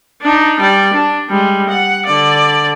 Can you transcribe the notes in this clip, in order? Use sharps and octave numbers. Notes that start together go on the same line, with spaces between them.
D4 D#4
G3 D5
D4
G3 G#3
F#5
D3 D5